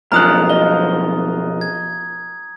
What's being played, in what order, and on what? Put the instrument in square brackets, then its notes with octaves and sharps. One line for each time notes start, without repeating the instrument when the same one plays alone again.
[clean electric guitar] B1 F#2 F3 [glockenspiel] A#5 D#6 [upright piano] F6 F#6
[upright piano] D#5 [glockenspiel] G7
[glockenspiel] G#6